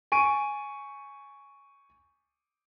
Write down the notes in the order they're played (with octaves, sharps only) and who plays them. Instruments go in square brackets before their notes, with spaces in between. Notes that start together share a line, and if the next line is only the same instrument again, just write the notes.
[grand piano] G#5 C#6 D7 D#7